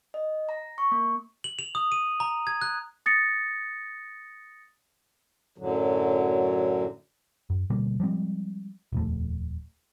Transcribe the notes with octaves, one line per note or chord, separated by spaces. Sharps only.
D#5
A#5
C#6
A#3
F#7
F7
D#6
D#7
A#5
G#6
F#6
D#6 A6 A#6 C#7
F#2 A2 D3 F#3
F#2
B2 D3 G3 A#3
F3 G3 G#3 C4
D#1 F2 A3